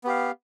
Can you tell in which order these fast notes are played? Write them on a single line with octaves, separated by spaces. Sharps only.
B3 G4 F5